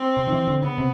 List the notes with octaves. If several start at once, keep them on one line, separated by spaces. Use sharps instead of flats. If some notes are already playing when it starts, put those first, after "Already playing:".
Already playing: C4
C3
D#3
E3
D3
C#3 B3
C3